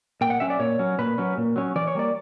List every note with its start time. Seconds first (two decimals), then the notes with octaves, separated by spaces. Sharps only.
0.21 A#2 G5
0.30 F#5
0.40 F#3 C#4 E5
0.50 D5
0.60 A#2 C#5
0.79 F#3 C#4
0.99 A#2 B4
1.18 F#3 C#4
1.37 A#2
1.56 F#3 C#4
1.76 E3 D5
1.87 C#5
1.95 G3 A#3 D5